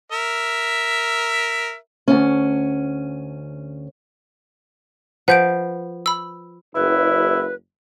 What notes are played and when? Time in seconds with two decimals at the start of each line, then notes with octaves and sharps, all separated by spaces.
0.12 A#4 E5
2.08 D2 C#4
5.28 F3 B4 F#5 G6 D7
6.06 B5 E6
6.75 F#1 E4 B4